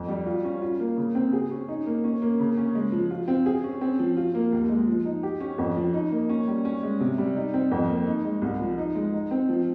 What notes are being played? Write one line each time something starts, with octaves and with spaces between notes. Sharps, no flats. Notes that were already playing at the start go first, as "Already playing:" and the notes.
Already playing: F2
G3
F4
C#4
F4
A#3
C#3
C4
G#4
C#4
D#4
A#3
C#4
A#3
C#3
C#4
G#3
F3
F4
C4
G#4
C#4
C4
F3
F4
A#3
D#2
G#3
F3
D#4
G4
C#4
F2
F3
D#4
A#3
C#4
G3
C#4
G#3
C3
G3
D#4
C4
F2
A#3
D#4
G#3
C2
F3
D#4
G#3
D#4
C4
F3